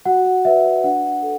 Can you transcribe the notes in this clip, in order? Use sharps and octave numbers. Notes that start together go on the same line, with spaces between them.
F#4 F#5
B4 D5 E5
D4 F#5
A4